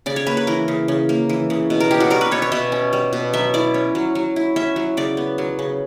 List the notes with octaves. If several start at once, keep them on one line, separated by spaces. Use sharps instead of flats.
C#3 D5
C#5
A#3 B4
B4
E3 A#4
C#3
C#3
A#3
E3
C#3
B2
A#4
C#4 G4
F#4
G3 A#4
B4
B2 C#5
C#5
B2 E5
C#4
G3
B2
F#3 E5
E4 D5
C#4
F#3
F#3
E4
C#4 E5
F#3
C#3 D5
B3
F#3
C#3